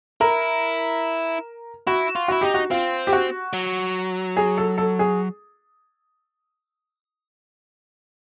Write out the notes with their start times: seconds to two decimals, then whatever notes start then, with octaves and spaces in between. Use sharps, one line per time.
0.21 E4 A#4
1.87 E4 F#4
2.16 F4
2.28 E4 F#4
2.41 D#4 G4
2.54 F#4
2.71 C4 F4
3.07 G4
3.13 F#4
3.53 F#3
4.37 G#4
4.58 A4
4.78 A4
4.99 G#4